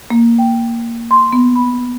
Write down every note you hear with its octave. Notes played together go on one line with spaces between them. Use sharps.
A#3
G5
C6
B3
B5